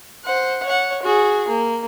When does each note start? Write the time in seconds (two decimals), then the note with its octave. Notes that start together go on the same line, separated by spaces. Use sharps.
0.24 C5 F#5
0.65 C#5 F#5
1.02 F#4 G#4
1.48 A#3